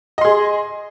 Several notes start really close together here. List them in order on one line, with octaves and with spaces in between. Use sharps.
D#5 C6 G#4